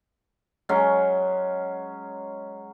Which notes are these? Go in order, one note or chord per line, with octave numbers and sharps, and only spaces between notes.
F#3 G#3 C#4